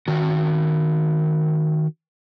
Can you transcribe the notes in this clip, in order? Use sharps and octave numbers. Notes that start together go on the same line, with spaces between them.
D#3 F#4